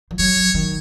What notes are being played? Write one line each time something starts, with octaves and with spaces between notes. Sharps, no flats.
F3
F#3 C#5
D#3